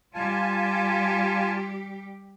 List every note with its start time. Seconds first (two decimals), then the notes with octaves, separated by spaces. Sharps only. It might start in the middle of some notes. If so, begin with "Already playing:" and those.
0.14 G3 F4 G4 G#5 A5